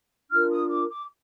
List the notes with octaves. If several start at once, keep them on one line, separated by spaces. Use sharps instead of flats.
D4 F4 A#4 F6
D#6
D6
D6